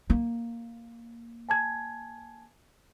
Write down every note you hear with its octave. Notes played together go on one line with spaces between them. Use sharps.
A#3
G#5 A5 G#6